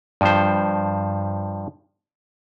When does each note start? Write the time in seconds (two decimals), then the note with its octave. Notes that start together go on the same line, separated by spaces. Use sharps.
0.21 G2 F3 C5